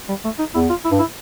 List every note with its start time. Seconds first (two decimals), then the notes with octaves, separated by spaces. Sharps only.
0.09 G3
0.25 A3
0.39 D#4
0.54 E2 E4
0.70 F4
0.85 E4
0.91 G2
0.99 E4